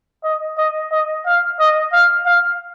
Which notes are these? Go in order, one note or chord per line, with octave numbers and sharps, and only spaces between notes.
D#5
D#5
D#5
F5
D#5
F5
F5